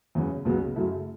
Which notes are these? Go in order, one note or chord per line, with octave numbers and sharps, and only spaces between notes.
E2 C#3 F#3 C#4 F#4
C#2 C#3 F#3 B3 F#4
F#2 C#3 F#3 A3 E4